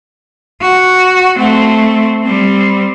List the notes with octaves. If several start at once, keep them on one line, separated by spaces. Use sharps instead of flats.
F#4
A3 C4
G3 C4